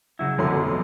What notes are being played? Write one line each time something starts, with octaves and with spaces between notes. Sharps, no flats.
C#3 F#3 E4
F1 B1 F#2 B2 C6
F2